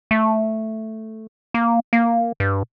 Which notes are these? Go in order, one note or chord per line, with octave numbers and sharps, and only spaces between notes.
A3
A#3
A#3
G2